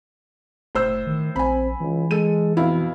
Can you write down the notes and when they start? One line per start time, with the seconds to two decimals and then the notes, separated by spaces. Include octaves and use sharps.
0.75 F#1 A2 C5 E6
1.07 D#3
1.36 A#1 C4 G#5 B5
1.80 C#2 E3
2.11 G#3 A4 D#7
2.57 F2 B2 E4 F5